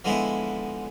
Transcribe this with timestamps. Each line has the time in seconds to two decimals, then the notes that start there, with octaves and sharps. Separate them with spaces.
0.05 D3 F3 G#3 B3 E4